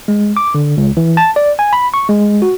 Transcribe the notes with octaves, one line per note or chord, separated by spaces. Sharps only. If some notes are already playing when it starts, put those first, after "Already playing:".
G#3
D6
D3
C#2
E3
A5
D5
G#5
B5
C#6
G#3
F#4